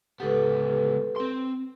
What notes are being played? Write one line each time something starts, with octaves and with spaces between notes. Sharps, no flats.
C#2 B3 G4 A4 B4
C4 C6